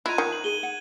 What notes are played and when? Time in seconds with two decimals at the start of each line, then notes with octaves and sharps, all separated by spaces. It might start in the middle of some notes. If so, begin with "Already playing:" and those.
0.06 E4 F4 D#5 A#5 F#6 G#6 D#7
0.18 D#3
0.32 F#7
0.44 G#4 D#7 G7
0.63 F#5